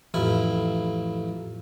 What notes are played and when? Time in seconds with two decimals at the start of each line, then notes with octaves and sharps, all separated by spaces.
0.14 A1 F2 E4